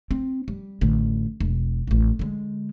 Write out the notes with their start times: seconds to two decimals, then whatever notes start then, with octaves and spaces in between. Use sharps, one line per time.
0.11 C4
0.48 G3
0.81 A1 D3
1.40 E1
1.87 A1 D2
2.19 D3 G#3